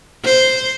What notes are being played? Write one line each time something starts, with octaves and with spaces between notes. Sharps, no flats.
C5